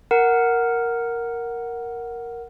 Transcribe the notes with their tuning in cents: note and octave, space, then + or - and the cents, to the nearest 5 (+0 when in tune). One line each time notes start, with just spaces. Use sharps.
A#4 +0 F#5 +0